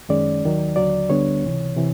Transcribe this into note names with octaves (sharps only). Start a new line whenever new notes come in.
F#2 D#3 G#3 C#4 D5
D#2 D#3 F#3
D#2 D3 F#3 D5
D2 D3 G3 B3 D4 C#5
C#2 C3 E3
C3 E3